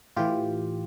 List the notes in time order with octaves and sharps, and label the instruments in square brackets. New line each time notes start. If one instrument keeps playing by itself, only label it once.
[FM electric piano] A2 E3 F4 G4